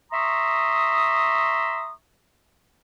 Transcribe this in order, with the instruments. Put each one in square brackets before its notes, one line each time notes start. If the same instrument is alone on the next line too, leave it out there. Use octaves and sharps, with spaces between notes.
[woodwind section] E5 A#5 C6 C#6 D#6